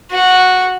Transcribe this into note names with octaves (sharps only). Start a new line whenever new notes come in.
F#4